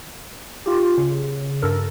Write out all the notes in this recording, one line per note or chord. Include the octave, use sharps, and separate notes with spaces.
F4 G4
C#3
G2 A4 A#4